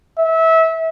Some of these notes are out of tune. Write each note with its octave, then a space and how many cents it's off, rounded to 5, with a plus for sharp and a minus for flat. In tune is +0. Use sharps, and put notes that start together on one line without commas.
E5 -25